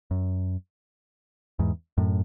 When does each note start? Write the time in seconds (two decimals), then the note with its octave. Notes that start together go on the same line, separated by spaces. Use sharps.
0.11 F#2
1.59 E2 G#2
1.98 F#2 A2